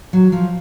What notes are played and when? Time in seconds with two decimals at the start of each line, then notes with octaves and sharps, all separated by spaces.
0.13 F#3
0.32 F3